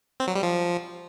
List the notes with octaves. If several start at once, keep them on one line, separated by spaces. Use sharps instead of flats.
C4
F#3
G3
F3